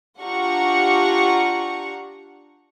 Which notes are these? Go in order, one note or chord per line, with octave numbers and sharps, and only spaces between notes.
D4 F4 G4 F#5 A#5 C#6